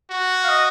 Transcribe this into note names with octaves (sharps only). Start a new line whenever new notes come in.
F#4
F5
D#5